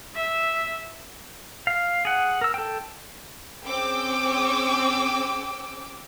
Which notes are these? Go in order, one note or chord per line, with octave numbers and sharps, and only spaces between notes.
E5
F5
G#4 F#5
A#4 E6
A4 G5
C4 C#4 G#4 G5 D6 E6